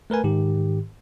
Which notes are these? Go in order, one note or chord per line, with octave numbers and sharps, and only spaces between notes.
A3 A#4 B4 G#5
G#2 D#3 G4